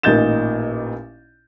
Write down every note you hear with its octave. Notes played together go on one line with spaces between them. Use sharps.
A1 A#2 D#4 G6 A6 E7